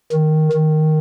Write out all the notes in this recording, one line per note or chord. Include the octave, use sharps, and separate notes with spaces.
D#3
D#3